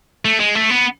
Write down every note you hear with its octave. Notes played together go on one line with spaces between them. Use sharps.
A3
G#3
A3
B3